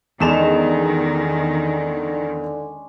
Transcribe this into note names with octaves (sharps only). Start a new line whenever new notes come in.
E2 D3 D#3 G#3 C#4 D4 E7 F7